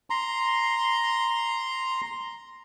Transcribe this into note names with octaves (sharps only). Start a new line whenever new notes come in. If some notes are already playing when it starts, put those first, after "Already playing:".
A#5 C6